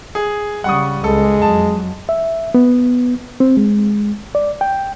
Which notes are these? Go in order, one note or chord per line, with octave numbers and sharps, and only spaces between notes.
G#4
C#3 G3 F#5 C#6 D#6
C#2 G#3 A4
F2 F#3 A5
E5
B3
C4
G#3
D5
G5